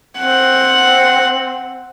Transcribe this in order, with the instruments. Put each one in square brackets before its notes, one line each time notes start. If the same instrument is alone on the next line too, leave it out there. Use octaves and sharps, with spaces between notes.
[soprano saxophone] C4 [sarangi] F#5